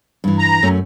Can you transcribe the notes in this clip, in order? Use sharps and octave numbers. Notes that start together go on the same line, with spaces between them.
G2 E3
A#5
F#2 A3 C#4